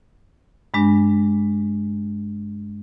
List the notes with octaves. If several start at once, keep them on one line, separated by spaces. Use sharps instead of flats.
G2 G#3 D4